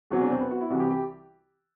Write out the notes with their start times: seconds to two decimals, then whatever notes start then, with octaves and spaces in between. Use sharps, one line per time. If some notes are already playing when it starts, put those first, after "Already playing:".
0.10 E1 E2 C3 F#3 F#4
0.21 D4
0.30 C4
0.41 B3
0.51 F#4
0.61 E4
0.70 C2 C3 E3 F#4
0.80 G4
0.90 G4